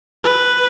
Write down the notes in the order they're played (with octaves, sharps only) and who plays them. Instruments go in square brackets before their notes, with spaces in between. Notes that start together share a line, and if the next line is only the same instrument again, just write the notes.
[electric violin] B4